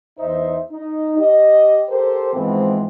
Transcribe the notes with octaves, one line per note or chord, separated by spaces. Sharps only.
E2 D#4 C5 E5
D#4
G4 D#5
G4 A4 A#4 C5
G#2 E3 F3 G#3 B3 C4